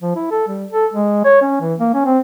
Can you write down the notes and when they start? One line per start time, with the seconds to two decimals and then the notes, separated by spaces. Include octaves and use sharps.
0.01 F3
0.16 E4
0.31 A4
0.47 G3
0.71 A4
0.93 G#3
1.25 C#5
1.42 C#4
1.60 E3
1.80 A#3
1.94 C#4
2.05 C4